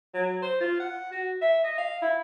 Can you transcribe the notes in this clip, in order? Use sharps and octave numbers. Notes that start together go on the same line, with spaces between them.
F#3
C5
F4
F#5
F#4
E5
D#5
F5
E4